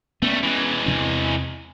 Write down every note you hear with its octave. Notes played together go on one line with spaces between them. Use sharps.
G3 A3 B3 C#4
E3 G#3
E2 C3 C4